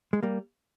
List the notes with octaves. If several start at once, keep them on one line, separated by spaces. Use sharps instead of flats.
G#3
G3 A#3